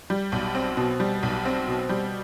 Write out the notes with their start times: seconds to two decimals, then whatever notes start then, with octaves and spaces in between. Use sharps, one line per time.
0.10 G3
0.32 B1
0.55 C4
0.77 B2
1.00 G3
1.23 B1
1.45 C4
1.68 B2
1.89 G3